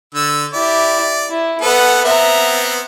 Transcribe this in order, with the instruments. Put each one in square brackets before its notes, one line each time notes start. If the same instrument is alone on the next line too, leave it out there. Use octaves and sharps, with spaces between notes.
[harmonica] D3 E6
[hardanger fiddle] E4 G4 [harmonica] D5
[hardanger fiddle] E4
[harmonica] B3 A4 [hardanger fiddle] B4 F#5
[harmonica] B3 C4 [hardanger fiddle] E5 A#5